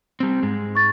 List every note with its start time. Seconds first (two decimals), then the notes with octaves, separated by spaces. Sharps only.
0.20 G3 C4
0.43 G#2 G#3
0.75 C#6 A6